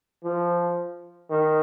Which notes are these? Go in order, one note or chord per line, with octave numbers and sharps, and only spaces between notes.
F3
D#3